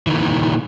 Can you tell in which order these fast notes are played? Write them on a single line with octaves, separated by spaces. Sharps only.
E3 D#3 A#2